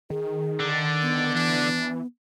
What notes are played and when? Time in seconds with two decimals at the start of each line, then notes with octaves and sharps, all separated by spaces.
0.10 D#3 G#4
0.60 D3 D5
1.02 B3
1.35 E3 D4